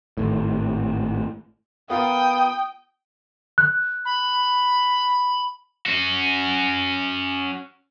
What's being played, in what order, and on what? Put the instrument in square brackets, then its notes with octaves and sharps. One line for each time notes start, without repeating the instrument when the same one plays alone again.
[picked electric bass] G#1 A2
[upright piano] B3 F4 A#4 [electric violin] G5 [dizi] D#6
[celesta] F#6
[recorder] B5
[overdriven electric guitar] C#4 F#4